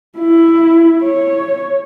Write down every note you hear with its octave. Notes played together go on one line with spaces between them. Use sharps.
E4
C#5